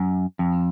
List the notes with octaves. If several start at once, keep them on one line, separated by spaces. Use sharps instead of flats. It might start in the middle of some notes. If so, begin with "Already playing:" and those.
Already playing: F#2
F2